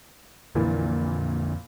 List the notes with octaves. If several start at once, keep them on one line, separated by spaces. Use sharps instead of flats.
F2 A#2 D3 E3